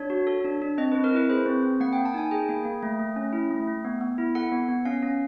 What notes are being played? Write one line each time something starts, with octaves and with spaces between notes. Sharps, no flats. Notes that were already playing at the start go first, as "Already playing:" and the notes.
Already playing: D4 C#5
F#4
A4
D4
D4
C4 D#5
C4 B4
A#4
E4 B4
G#4 C5
C4
C4
A#3 F#5
G5
A#3
A5
D#4 G#5
G#4 G5
A#3
A#3
A3
A3
C#4
E4
A3
A3
B3
B3
E4
A4 F#5
B3
B3
C#4 F5
C#4